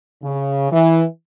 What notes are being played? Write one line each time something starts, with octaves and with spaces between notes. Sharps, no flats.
C#3
E3